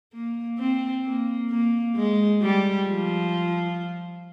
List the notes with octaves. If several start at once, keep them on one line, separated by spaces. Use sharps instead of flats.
A#3
C4
A#3
A#3
G#3
G3
F3